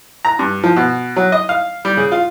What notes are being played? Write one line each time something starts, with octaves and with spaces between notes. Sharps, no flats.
A#5
G2
F3
B2
F#3
D#5
F5
G3
C#3
F4